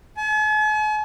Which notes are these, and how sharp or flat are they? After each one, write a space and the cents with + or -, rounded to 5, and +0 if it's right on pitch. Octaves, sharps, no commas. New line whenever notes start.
G#5 +45